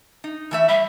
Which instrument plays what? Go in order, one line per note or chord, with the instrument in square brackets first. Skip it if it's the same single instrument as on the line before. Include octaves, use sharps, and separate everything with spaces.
[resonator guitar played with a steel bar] D#4
E3 A3 E5
[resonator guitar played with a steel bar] G3 [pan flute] E5